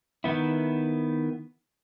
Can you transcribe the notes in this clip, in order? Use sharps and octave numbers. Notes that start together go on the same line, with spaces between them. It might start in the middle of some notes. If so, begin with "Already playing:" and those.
D#3 B3 E4